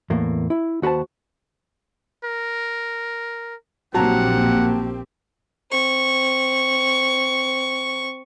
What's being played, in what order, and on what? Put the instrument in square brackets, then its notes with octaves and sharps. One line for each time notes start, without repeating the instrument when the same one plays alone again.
[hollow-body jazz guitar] E2 A2 A#3
E4
D#2 F#4 B4 C5 A5
[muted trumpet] A#4
[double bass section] A#1 A#3 [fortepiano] F#3 A5 A#5 [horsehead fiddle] C4 G4 [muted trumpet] F#5
[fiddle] C4 C#6